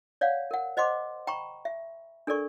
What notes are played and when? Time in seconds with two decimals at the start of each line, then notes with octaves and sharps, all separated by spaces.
0.21 C#5 D5 F5 F#5
0.51 A#4 F#5
0.77 C5 D#5 F#5 C6 D6
1.27 G5 A#5 B5 C#6
1.65 E5
2.27 D4 A4 A#4 D5 C#6